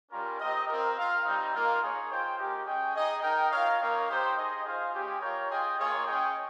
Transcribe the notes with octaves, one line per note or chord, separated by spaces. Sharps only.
G3 C#4 F4 A#4
C4 G4 A#4 D#5
C4 F4 A#4
F4 A#4 F5
G3 C4 D#4
A#3 F4 A#4 F5
D#4 G#4 C#5
F4 C5 G5
G#3 C#4 G4 A#4 D#5
C#4 G#4 D#5 G5
D#4 G#4 D#5
D#4 A#4 D#5 G5
F4 A#4 C#5 F5
A#3 D#4 A#4 C#5 F5
D#4 G4 C5 G5
D#4 G#4 D#5
F4 G#4 C5 F5
G#3 C#4 G4
F4 A#4 C#5 G5
F4 G#4 D#5 G5
A#3 F4 G#4 C#5
C#4 G#4 D#5 G5